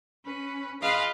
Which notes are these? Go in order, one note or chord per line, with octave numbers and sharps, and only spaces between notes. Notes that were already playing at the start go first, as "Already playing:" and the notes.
C#4 B4
F4 G#4 B4 D#5 F5